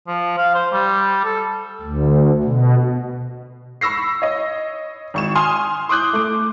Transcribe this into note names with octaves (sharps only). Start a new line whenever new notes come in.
F3
F5
C5
G3
A4
D2
B2
B5 C#6 E6 A#6 C7
C#5 D#5
G#1 C#6 E7
G#5 C6 D#6 F6
C6 D6 D#6 F#6 G6
A3 D6